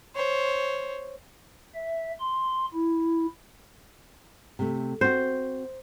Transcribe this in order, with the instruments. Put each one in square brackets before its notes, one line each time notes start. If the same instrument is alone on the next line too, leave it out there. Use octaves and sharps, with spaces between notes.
[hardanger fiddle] C5 C#5
[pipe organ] E5
C6
E4
[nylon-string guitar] C3 A3
[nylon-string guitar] C4 F#4 [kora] C5